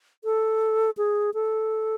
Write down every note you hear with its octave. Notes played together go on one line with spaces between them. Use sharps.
A4
G#4
A4